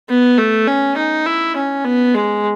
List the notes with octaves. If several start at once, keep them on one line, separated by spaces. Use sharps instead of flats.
B3
A3
C#4
D#4
E4
C#4
B3
G#3